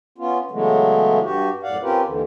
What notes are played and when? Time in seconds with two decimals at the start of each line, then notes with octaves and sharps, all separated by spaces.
0.18 B3 C#4 F4
0.51 C#3 E3 F#3 G#3 A3 B3
1.22 G2 F#4 G4
1.63 F#2 A2 D5 F5 F#5
1.82 C4 C#4 F4 G4 A#4 B4
2.06 D#2 D3 E3